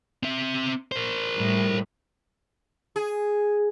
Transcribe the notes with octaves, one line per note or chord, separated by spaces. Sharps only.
C4 E5
A#4 C5
A2 G3
G#4